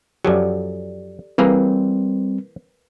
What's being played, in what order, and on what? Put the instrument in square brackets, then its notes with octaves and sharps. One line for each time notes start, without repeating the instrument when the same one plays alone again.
[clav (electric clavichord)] F#2 F3 F#3 [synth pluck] G4 A4 D5
[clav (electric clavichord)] E3 A#3 G#4 [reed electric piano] G3 C4 [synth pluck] A#4 B4